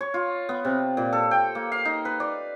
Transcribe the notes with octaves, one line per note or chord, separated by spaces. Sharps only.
C#5
F4
B3
C3
A#2
A4
G5
A#3
F5
D#4
B4
D5